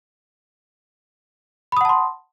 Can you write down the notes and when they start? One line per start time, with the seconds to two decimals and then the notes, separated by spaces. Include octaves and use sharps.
1.72 B5
1.77 D#6
1.81 F#5
1.85 A5
1.89 C6